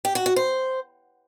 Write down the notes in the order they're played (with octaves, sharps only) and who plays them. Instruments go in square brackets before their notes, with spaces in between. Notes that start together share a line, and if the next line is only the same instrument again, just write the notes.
[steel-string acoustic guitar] G4
F#4
F#4
C5